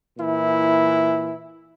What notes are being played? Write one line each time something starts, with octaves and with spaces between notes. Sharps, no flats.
A#2 E3 E4